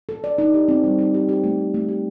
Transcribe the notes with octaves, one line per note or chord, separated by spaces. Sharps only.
A4
D5
D#4
G4
C4
G3
D#4
G4
G4
A3
C4
A3
G4